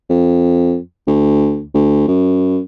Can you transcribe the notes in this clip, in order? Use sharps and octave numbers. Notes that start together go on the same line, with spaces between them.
F2
D2
D2
F#2